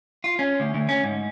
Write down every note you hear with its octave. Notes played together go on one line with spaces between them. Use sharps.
F4
C#4
D2
D2
C#4
G#2